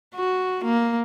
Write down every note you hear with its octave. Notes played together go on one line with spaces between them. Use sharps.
F#4
A#3